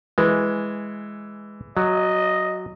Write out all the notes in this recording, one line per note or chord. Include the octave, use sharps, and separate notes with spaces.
E3 G#3
F#3 D#5